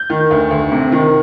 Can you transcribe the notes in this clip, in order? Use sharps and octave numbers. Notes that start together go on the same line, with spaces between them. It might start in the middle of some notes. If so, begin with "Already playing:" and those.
Already playing: G6
D#3
D2
D2
C3
D#3